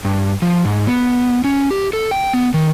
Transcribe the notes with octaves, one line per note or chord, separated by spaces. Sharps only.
G2
F3
G#2
B3
C#4
G4
A4
G5
B3
D#3